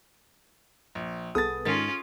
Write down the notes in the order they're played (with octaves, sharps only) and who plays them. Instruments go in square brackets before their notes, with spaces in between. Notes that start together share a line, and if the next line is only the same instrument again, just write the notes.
[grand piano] A#1
[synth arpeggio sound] C2 B3 [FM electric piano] G#4 A4 [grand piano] D#6 A6
[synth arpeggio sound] G#2 D#3 [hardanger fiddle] C#4 F4 [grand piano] A6